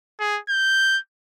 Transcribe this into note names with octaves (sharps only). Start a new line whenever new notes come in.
G#4
G6